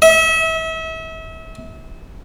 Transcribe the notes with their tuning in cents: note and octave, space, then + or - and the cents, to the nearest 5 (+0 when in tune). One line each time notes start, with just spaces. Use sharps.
E5 -35